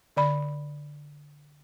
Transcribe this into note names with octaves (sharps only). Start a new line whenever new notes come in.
D3 D5 B5